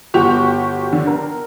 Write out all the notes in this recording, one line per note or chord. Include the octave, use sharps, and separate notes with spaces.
G1 F#4 G4 C#6 F7
D3
A#4